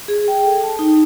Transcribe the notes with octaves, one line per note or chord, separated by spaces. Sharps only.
G#4
G5
A4
A5
D#4